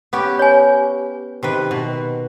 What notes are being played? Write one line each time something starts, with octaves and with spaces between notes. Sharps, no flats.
B3 C#4 G4
C#5 G#5
C3 D#3 B4
B2